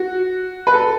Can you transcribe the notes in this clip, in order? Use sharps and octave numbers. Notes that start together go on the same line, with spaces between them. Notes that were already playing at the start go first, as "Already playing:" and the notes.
Already playing: F#4
B4
A4